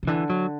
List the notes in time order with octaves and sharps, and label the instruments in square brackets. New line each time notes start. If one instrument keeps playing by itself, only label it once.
[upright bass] C#3
[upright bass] D3 [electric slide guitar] E3
[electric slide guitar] F#3